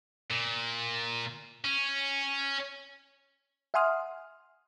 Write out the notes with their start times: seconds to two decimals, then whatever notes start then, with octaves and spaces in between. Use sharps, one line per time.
0.30 A#2
1.64 C#4
3.74 E5 F#5 G#5 C6 D#6 F6